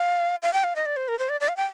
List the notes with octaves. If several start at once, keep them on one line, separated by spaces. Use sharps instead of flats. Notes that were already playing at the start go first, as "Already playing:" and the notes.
Already playing: F5
F5
G5
F5
D#5
D5
C5
A#4
C5
D5
D5
F5
G5